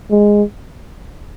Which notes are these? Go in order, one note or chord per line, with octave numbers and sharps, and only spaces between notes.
G#3